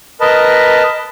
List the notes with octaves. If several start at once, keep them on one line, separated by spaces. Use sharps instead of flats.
A#4 B4 D#5 A5